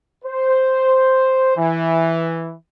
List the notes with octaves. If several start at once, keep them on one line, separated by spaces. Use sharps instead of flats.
C5
E3